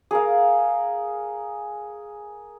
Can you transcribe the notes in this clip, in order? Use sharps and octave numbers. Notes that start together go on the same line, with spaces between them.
G#4 A#4 F5